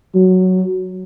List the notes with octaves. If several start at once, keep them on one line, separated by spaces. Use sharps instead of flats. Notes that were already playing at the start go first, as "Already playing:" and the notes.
F#3